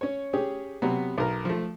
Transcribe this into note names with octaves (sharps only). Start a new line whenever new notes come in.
C#4 C#5
C#4 G4 G#4
C3 F#3 B3
B1 A#4
F3 A3